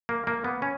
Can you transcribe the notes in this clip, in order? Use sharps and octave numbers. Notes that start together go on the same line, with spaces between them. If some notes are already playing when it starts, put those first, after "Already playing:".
A#3
A#3
B3
C#4